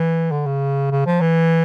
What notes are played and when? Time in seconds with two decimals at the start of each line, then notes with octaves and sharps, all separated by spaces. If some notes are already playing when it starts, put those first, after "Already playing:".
Already playing: E3
0.31 D3
0.46 C#3
0.91 C#3
1.06 F3
1.21 E3